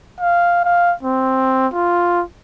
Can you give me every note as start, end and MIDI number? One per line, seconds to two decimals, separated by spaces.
0.20 0.61 77
0.65 0.94 77
1.03 1.68 60
1.73 2.23 65